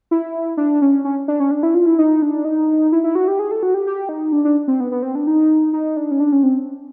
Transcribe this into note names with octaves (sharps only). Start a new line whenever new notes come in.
E4
D4
C#4
C#4
D4
C#4
D4
E4
F4
E4
D#4
D4
D#4
E4
E4
F#4
G4
G#4
A4
F#4
G4
G4
D#4
D4
D4
C4
B3
B3
C4
D4
D#4
D#4
D4
C#4
D4
C#4
C4